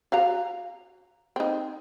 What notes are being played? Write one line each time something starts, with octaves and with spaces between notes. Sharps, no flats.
F#4 F5 A#5
C4 D#4